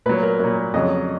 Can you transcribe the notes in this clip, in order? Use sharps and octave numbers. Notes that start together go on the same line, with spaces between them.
A#2 F#3 B4
A#4
A#2 F#3 A#4
F2 C#3 F#3 D#5